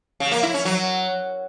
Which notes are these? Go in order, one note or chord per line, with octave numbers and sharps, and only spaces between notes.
C#3
A#3
E4
C#4
F#3